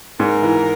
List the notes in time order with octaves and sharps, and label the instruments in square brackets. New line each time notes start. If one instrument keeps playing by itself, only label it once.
[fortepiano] G#2 [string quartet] A#4
[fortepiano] E3